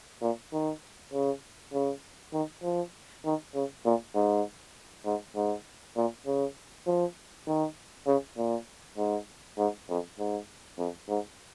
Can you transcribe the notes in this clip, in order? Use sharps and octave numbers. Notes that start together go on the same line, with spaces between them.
A#2
D#3
C#3
C#3
D#3
F3
D#3
C#3
A#2
G#2
G#2
G#2
A#2
C#3
F3
D#3
C#3
A#2
G#2
G#2
F2
G#2
F2
G#2